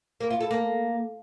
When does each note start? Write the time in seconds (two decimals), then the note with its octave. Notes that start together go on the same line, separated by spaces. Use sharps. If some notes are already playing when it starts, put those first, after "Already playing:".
0.20 A#3
0.30 F4
0.41 A4
0.51 A#3